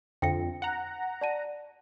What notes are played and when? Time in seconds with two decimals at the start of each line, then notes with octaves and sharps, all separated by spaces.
0.22 F2 D3 G5 A#6 C#7
0.62 F#5 A#5
1.21 D5 A5 D#7